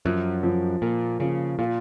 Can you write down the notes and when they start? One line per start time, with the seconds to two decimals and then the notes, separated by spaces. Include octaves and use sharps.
0.05 F#2 F3
0.43 F3
0.82 A#2 A#3
1.20 C#3 F3
1.59 A#2 F4